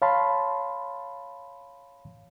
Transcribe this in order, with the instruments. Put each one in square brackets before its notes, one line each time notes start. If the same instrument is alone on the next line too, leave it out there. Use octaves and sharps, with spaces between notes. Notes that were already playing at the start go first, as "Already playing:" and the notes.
[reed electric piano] C#5 F5 A5 B5 C6